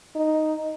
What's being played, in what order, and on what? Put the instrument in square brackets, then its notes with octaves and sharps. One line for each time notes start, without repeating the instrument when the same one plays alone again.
[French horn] D#4